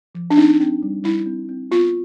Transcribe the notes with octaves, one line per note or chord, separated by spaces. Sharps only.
F3
D4
C4 D#4
C4
G3
G3 E4
C4
C4
B3 F4